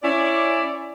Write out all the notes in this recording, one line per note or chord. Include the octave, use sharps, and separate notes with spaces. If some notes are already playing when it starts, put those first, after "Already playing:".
C#4 E4 D5